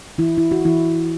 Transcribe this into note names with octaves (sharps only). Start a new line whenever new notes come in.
E3 E4
E4
F#4
E3 E4